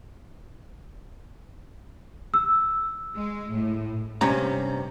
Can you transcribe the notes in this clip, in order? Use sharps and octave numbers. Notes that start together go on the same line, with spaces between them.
E6
G#3
A2
G2 C3 C#4 A#5